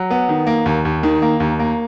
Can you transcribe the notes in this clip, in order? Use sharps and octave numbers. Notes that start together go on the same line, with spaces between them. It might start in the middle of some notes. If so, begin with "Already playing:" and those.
Already playing: F#3
B3
D#3
A#3
D#2
D#2
D#3
A#3
D#2
A#3